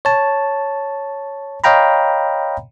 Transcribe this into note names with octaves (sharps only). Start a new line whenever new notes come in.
C#5 A5
C#5 D#5 F5 G5 A#5 B5